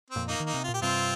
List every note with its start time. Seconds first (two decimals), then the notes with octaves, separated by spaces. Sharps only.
0.11 C4
0.16 F2 A#2
0.28 A#3 D#4
0.40 D#3
0.47 A#3 D#4
0.54 C3
0.64 F4
0.68 A#2
0.74 G4
0.82 G2 C3 C4 F4